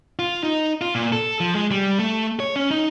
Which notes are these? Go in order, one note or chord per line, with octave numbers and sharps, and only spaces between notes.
F4
D#4
F4
A#2
A4
F3
G#3
G3
A3
C#5
C#4
D#4